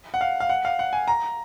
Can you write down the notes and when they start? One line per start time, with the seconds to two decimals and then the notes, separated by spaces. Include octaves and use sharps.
0.14 F#5
0.21 F5
0.40 F5
0.49 F#5
0.65 F5
0.79 F#5
0.93 G#5
1.08 A#5